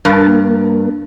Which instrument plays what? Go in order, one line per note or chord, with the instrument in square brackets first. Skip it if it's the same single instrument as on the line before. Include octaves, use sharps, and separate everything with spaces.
[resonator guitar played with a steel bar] G2 [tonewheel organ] A#4 A5
[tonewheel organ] A#3